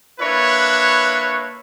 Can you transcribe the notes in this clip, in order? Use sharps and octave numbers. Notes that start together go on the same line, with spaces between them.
A#3 D4 E4 B4 C#5